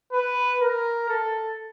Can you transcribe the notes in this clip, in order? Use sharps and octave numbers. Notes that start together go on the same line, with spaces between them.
B4
A#4
A4